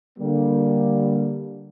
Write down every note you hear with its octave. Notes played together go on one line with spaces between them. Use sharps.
D3 G3 A#3